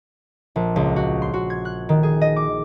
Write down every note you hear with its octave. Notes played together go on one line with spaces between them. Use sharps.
A#1
C#2
F#4
C6
F#4
G#6
F#6
D#3
G#4
D#5
D6